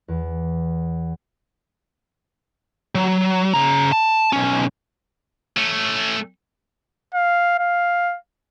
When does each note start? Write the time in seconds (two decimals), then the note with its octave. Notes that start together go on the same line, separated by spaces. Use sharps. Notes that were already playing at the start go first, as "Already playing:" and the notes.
0.08 E2
2.95 F#3
3.54 C#3 A#5
3.92 A5
4.33 B1 C#4
5.57 A3 C#4
7.15 F5
7.59 F5